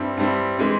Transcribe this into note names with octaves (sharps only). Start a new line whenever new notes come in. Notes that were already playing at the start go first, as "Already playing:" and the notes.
Already playing: G2 G3 C4 E4
G2 G3 C4 E4
E3 G#3 C4